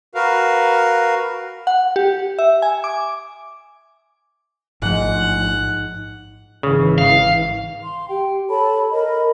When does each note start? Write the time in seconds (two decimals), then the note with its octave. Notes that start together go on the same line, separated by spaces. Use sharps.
0.15 F#4 A#4 B4 F5
1.67 F#5
1.96 G4
2.39 E5
2.62 G#5
2.84 D6
4.82 A1 G#2 F3 F#5
6.63 G#1 G#2 C#3 E3
6.98 F5
7.83 C6
8.09 G4 G5
8.49 A4 C#5 A5 B5
8.91 A#4 D#5 B5